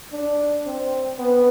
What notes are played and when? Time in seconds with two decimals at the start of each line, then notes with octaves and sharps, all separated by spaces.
0.12 D4
0.66 C4
1.19 B3